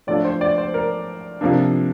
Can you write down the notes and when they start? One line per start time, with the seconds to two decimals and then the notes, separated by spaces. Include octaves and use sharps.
0.07 A2 F3 A3 D4 D5
0.25 C5
0.41 D5
0.58 C5
0.74 A#4
1.41 C3 F3 A#3 D4